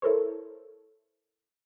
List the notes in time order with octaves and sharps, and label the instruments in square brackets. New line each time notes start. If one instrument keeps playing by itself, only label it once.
[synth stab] E4 A4 A#4 C5 C#5